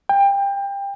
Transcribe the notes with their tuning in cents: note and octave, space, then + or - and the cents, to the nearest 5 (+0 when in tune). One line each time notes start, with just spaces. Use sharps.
G5 +25